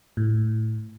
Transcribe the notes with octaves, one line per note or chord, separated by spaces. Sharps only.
A2